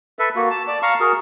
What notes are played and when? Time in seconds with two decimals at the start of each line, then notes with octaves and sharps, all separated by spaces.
0.19 A4 B4 E5
0.35 A#3 F#4
0.50 A5
0.68 D5 A5
0.82 F5 A#5 C#6
1.00 F#4 G#4 A#4